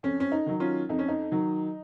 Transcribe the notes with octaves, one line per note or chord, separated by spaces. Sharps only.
F2 C#4
C#4
D#4
D#3 F#3
C#4 F4
F2 D#4
C#4
D#4
D#3 F#3